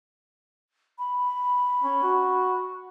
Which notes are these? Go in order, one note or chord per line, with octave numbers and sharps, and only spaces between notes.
B5
C#4
F#4